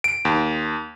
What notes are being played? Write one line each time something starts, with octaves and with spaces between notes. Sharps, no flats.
D7
D#2